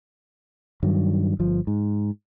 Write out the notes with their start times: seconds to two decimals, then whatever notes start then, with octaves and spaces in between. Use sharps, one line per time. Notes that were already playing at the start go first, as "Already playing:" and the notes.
0.83 G2 D#3 F#3
1.39 G1 F3
1.67 G#2